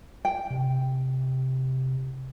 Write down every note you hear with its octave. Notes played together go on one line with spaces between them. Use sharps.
G5
C3